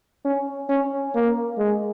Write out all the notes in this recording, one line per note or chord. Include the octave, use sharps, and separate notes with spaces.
C#4
C#4
A#3
G#3